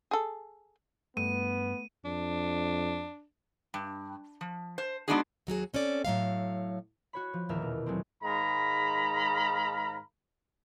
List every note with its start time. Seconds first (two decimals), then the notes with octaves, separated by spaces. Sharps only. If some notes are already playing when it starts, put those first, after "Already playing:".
0.11 G#4 A4
1.17 G2 A3 B3 D#7
2.05 F2 D4
3.74 G2
4.41 F3
4.78 C5
5.08 G#3 B3 D4 D#4 F#4 G#4
5.47 D#2 F#3 F#4 G#4
5.74 C4 C#4 A4 D5
6.05 A2 F#3 G#3 F5
7.13 F#4 C#5 B5
7.33 F3
7.49 D#1 E2 A#3 A#4 E5 F6
7.62 B2
7.86 F#3 G#3 A3 C4
8.22 G#2 D#3 G#3 F5 A#5 B5